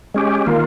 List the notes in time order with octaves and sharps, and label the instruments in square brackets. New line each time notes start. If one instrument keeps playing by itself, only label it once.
[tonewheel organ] G#3 C#4 G4
D#3 A#3 F4